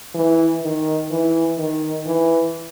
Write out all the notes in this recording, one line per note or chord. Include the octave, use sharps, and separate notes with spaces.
E3
D#3
E3
D#3
E3